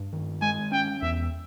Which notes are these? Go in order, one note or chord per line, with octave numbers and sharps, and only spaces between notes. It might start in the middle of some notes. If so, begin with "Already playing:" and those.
Already playing: G2
D#3
G#3 G#5
C#4 G5
E2 E5